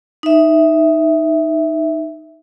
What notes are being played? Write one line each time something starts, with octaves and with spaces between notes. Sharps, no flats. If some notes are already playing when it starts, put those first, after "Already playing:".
D#4 E5